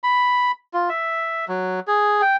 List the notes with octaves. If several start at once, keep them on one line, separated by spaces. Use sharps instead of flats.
B5
F4
E5
F#3
G#4
G5